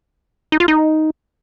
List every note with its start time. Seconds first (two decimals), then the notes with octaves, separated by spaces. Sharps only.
0.52 D#4
0.60 F4
0.68 D#4